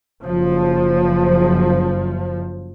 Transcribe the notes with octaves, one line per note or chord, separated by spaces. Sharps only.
F#1 F3